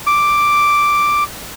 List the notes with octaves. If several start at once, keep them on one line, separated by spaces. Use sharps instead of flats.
D6